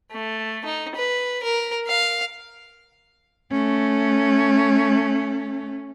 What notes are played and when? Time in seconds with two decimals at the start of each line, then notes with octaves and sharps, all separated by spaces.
0.12 A3
0.65 D#4
0.96 B4
1.43 A#4
1.88 F5
3.51 A3 C#4